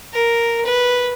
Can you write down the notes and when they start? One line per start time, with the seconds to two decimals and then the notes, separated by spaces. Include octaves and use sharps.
0.13 A#4
0.65 B4